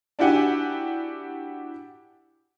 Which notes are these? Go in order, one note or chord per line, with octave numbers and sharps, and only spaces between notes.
D4 E4 F#4 G4 F#5 G#5